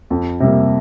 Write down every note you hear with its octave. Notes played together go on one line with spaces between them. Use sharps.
F2
C3 G3 A#3